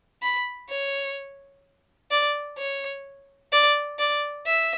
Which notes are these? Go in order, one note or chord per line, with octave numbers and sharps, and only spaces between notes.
B5
C#5
D5
C#5
D5
D5
E5